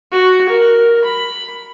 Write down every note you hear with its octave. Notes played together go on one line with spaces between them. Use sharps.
F#4
A#4
B5